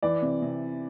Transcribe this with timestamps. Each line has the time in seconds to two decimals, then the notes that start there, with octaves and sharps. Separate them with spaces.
0.03 E3 D5
0.22 C3
0.42 C3